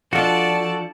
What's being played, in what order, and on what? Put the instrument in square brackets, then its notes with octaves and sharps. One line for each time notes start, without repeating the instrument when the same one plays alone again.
[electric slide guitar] F3 [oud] D4 F4 [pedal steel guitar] F#4 A4 [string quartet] D5 A5